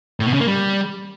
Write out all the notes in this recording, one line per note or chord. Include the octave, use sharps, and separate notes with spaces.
A2
B2
C#3
A#3
G3